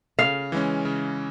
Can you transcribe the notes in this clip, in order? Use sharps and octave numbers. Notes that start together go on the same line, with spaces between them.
C#3 F5
E3 G#3 C#4
C#3